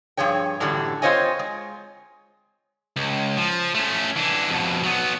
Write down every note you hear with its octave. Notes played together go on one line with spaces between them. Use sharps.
G2 F3 G#4 C#5 G5
F#2 A2 D3 E3 G3
C4 F4 C5 C#5 D#5 G#5
G#3
C#2
F3
A3 C#4
E3 D4
F2 B2
F#3 B3